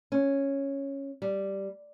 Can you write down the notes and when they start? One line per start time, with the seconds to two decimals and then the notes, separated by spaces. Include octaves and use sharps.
0.12 C#4
1.22 G3